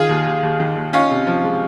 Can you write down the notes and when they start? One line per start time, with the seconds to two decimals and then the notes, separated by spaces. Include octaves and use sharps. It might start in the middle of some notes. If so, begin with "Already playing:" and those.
Already playing: D#3 F4 G#4
0.09 D#2
0.26 D#2
0.43 D#2
0.60 D#3
0.76 D#2
0.93 C#4 D#4 F4
1.10 C3
1.27 F3
1.44 G#3